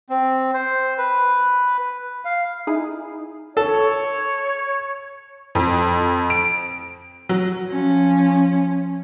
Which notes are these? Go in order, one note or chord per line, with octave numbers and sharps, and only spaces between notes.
C4
C5
B4
F5
D#4 E4 G#4
A4 C#5
F2
D7
F#3
F3 C#4